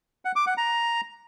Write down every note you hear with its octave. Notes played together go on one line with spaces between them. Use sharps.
F#5
D6
F#5
A#5